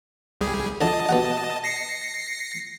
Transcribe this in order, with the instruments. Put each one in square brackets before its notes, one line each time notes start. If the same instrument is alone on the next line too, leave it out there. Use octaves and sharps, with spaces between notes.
[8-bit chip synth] C2 G3 G#4
[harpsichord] F2 D3 [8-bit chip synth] D#5 A5
[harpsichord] B2 G4 F#5
[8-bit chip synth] A#6 C7 C#7